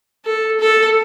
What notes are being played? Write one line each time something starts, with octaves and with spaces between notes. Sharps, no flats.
A4
A4